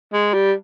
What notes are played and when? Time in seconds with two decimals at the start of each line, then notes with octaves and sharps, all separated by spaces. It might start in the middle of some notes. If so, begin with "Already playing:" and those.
0.13 G#3
0.34 G3